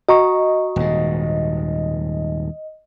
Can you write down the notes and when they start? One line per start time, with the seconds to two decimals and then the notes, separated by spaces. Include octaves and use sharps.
0.09 F#4 D#5 A#5 C#6
0.76 D#1 G#2